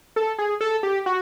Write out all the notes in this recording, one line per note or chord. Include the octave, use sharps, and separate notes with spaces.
A4
G#4
A4
G4
F#4